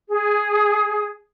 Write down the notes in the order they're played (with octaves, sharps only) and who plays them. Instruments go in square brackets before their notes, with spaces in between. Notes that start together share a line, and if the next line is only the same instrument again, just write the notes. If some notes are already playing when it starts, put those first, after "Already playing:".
[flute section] G#4